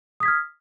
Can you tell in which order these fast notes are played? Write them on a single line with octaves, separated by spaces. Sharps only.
D#6 B6 G#6 F6